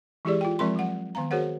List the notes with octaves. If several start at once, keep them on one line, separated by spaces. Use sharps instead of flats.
E3 G#3 E4 G4 G#4 D5
F4 G5
F3 G#3 C4 A#4 B5 C6
F#3 F#5
D#3 B3 F5 A#5
F#4 G#4 A#4 C5 C#5 F#5